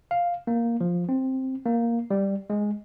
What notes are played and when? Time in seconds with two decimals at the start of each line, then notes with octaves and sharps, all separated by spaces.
0.11 F5
0.47 A#3
0.81 F3
1.09 C4
1.66 A#3
2.11 G3
2.50 G#3